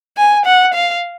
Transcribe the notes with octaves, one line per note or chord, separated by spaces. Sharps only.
G#5
F#5
F5